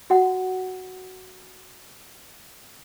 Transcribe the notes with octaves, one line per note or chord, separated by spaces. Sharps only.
F#4 F#5